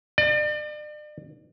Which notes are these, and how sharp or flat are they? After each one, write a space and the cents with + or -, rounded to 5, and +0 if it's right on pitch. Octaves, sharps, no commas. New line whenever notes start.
D5 +40